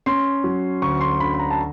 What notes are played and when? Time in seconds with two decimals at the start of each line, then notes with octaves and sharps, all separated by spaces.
0.06 C#4 C6
0.44 F#3
0.82 D2 C#6
1.01 C6
1.20 D3 B5
1.34 B5
1.39 A#5
1.51 A5